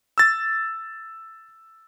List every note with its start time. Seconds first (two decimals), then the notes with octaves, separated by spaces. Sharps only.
0.18 E6 A6